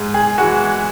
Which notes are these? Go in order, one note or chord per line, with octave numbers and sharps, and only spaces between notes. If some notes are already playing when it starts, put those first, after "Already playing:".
Already playing: G#2
G#4
E3 G#3 F#4